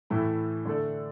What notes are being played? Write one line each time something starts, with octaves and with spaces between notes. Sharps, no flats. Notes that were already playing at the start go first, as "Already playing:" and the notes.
A2 E3 A3 E4
D3 A3 D4 A4 D5